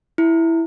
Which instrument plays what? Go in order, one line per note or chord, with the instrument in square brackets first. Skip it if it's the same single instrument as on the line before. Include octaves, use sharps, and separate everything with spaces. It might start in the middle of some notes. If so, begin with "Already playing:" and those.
[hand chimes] E4